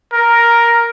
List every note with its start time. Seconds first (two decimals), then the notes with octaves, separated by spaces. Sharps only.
0.13 A#4